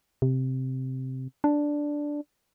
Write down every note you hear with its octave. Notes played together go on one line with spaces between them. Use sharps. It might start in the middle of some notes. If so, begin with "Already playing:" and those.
C3
D4